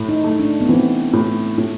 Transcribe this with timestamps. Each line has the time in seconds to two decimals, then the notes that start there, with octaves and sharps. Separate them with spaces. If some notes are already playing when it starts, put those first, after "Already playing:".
Already playing: A2
0.09 D#4
0.24 A3
0.40 D4
0.61 B3
0.69 E3 C4
1.13 A2
1.58 A2